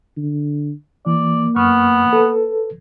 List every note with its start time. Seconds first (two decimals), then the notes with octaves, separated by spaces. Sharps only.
0.17 D3
1.06 E3 A#3 D5
1.56 F#2 B3 C#6 F6
2.13 A4 B4